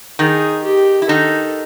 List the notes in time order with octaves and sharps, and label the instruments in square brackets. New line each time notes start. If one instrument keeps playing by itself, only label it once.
[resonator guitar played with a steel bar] D#3 D#4 [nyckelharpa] G#4
[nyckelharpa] G4
[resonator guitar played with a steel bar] E4
[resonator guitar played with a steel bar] D#3 D#4 [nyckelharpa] A4